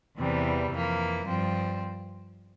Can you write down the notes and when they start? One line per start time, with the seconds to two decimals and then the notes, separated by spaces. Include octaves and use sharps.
0.18 E2 C3 E3 G3
0.71 F2 E3 A#3
1.25 G2 F3 C4